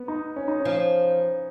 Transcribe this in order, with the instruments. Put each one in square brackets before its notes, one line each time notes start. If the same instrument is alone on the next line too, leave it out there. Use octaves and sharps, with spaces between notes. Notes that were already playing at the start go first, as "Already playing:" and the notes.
Already playing: [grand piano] B3
D#4
C#4
D#4
C#4
[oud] F3